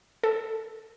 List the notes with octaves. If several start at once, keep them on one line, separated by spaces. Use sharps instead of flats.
A4